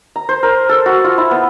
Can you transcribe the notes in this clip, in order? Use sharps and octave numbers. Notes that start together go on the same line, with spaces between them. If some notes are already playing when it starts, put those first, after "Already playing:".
A#5
C5
A#4
A4
F#4
F4
E4
B3